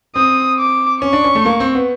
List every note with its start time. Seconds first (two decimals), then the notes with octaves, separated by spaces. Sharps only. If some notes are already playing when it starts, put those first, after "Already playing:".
0.16 C4 D#6
0.59 D6
1.02 C#4 C#6
1.13 D4
1.24 C#4
1.35 A3
1.46 A#3
1.60 C4
1.75 B3